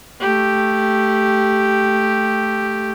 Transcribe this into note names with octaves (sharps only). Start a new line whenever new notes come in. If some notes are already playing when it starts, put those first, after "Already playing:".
A3 G4